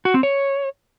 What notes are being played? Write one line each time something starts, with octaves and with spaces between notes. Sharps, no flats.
F#4
C4
C#5